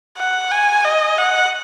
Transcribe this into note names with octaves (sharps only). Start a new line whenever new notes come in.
F#5
G#5
D#5
F#5